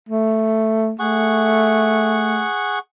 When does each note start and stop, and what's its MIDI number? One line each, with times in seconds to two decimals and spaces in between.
0.09 0.93 57
0.99 2.45 57
0.99 2.79 68
0.99 2.79 78
0.99 2.79 85